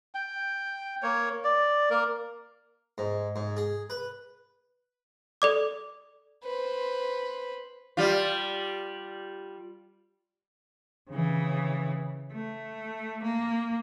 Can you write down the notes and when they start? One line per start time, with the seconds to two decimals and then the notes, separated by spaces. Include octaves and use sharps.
0.15 G5
1.03 A#3 C#5
1.44 D5
1.90 A#3 A#4
2.98 G#2
3.36 G#2
3.57 G#4
3.90 B4
5.42 A4 D5 D6
6.44 B4 C5
7.97 G3 F4
11.10 C#3 E3
12.32 A3
13.23 A#3